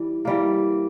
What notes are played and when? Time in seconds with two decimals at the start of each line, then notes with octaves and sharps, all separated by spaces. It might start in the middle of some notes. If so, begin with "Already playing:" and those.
Already playing: E3 G3
0.25 E3 G3 A#3